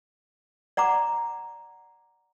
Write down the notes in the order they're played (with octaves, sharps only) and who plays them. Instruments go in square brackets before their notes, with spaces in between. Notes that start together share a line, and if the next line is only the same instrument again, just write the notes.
[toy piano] D5 F#5 A#5 D6